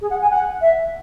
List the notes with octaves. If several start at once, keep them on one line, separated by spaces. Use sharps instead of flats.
G#4
F#5
G#5
F#5
E5